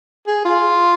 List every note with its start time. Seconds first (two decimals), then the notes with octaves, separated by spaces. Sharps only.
0.27 G#4
0.45 F4